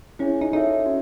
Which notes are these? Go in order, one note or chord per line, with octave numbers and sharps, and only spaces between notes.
C#4 E4 G#4 C#5 G#5
D#4
D#4 F#4 A4 C#5 E5
C#4 F#4